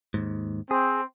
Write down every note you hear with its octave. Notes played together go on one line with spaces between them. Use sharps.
D#2 G#2
C4 G#4